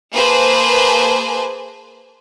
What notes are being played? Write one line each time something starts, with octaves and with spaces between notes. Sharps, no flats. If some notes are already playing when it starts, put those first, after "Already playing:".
A#3 G#4 B4 C5 G#5 A5